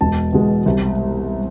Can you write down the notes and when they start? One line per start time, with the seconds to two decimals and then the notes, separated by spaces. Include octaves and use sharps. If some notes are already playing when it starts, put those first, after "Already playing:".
0.01 E1 A5
0.32 E2 B2 G#3
0.66 C2